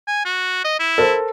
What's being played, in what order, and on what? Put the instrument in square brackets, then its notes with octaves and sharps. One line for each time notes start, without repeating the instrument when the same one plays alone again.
[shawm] G#5
F#4
D#5
E4
[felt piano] A4 A#4 C5